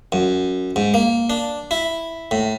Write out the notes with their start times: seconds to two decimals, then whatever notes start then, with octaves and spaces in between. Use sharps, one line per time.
0.12 F#2
0.76 G#2
0.94 A#3
1.30 D4
1.71 E4
2.31 A2